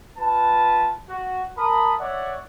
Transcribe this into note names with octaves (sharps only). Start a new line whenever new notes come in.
F4 B4 A5
F#4
A#4 A5 B5 D#6
C#5 D5 E5 F#5